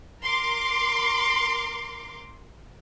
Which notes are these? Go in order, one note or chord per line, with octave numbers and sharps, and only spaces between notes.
A#4 C6 D6